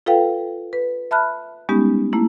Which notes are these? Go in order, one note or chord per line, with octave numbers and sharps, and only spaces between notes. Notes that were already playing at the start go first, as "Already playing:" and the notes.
F4 A4 B4 F5 G5
B4
E5 A5 B5 F6 F#6
G3 G#3 B3 C#4 D#4 G4
A3 A#3 E4